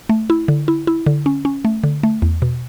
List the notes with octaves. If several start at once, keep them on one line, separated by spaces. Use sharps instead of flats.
A3
E4
D3
E4
E4
D3
C#4
C#4
A3
D3
A3
E2
B2